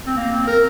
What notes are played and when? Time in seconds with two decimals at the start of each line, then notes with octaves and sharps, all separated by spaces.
0.06 C4
0.17 A#3
0.32 C4
0.47 A#4